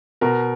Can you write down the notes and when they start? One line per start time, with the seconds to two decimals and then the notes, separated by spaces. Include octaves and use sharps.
0.21 B2 A#4